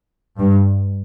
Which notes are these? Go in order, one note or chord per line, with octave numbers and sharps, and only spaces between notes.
G2